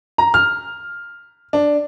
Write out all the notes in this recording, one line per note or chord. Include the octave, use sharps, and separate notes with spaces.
A#5
F6
D4